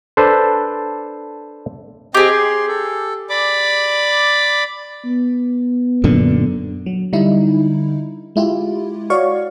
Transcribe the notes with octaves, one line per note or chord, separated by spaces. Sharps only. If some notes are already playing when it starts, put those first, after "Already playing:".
D4 A4 B4 C5
C4 G4 G#4 D#5 G5
C6
A4
D5 B5 D6
B3
F#2 A#2 D3
F#3
D3 G3 D#4 E4
G#3 E4 F4 G4
F#4 C#5 D5 F5 C#6